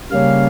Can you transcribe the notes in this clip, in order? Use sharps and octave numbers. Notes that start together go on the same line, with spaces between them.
C#3 G3 A#3 C#4 F5